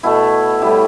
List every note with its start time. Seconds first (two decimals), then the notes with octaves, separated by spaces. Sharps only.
0.03 B2 A3 E4
0.62 A2 G3 E4